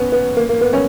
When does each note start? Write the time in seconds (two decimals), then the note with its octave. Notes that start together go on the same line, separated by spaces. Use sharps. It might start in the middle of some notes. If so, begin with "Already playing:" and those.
Already playing: B3 C#4
0.12 B3
0.36 A#3
0.49 A#3
0.61 B3
0.73 C#4